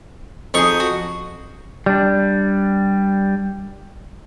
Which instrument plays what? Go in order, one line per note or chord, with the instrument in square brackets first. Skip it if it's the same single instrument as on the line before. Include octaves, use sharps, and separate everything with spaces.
[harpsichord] F2 C#6 [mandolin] D#4 G#4
[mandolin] F#4
[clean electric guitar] G3 D4